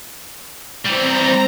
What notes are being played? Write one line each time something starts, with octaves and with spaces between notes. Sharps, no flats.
E3 G3 C4 A#5